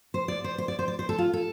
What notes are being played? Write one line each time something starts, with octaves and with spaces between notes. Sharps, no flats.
C5
D5
C5
C5
D5
C5
D5
C5
A4
F4
A4